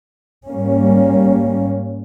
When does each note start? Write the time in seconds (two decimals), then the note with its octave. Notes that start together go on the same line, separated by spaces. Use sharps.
0.48 G#2 G3 A#3 C#4